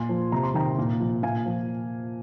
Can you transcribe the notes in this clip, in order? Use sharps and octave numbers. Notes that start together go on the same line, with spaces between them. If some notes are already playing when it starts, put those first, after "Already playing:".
Already playing: A#2 G#5 C6
F3
C3 A#5
C6
D#3 G5 A#5
A#2
F3
A#2 F5 G#5
F3